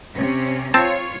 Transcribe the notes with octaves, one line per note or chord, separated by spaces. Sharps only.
C3 C#4
C4 F4 C#5 A5